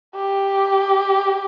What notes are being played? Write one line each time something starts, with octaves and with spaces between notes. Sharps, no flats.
G4